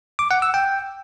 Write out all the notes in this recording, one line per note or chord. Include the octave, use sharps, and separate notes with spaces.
D6
F#5
E6
G5